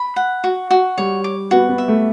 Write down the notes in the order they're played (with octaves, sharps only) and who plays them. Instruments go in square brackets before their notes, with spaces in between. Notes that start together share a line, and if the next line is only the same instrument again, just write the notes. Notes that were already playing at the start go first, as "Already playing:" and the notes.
Already playing: [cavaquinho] B5
F#5
F#4
F#4
[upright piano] G3 [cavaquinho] C#5
[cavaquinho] D6
[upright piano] B3 [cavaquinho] F#4
[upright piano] B3
[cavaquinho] E5
[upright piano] A3